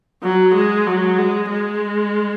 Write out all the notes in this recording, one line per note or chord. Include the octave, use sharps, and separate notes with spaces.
F#3
G#3
F#3
G#3
G#3